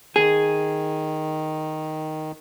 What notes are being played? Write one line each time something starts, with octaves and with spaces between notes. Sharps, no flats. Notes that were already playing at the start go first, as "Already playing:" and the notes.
D#3 G#4